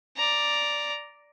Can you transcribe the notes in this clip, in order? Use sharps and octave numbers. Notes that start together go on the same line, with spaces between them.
D5 A#5